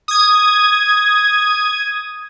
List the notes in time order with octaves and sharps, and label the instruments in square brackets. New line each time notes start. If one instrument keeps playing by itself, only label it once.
[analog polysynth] D#6 G#6